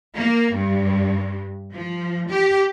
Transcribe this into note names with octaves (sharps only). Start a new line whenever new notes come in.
A#3
G2
F3
G4